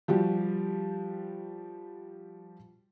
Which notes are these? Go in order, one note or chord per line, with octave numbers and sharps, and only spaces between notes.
F3 G3 F#4 G4